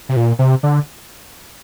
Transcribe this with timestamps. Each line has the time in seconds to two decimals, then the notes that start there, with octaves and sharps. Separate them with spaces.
0.09 C3
0.16 A#2
0.39 C3
0.63 D3